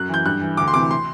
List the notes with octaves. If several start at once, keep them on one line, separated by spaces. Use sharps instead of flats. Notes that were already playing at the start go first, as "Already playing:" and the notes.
Already playing: F#2 F#6
E3 G6
G2 F#6
E3
D2 D6
C6
C3 E3 D6
C6